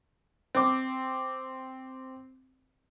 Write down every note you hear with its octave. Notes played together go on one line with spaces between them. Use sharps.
C4 D6